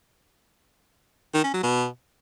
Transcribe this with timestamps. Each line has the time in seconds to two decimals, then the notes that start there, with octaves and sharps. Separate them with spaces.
1.34 D#3
1.44 C#4
1.53 F#3
1.63 B2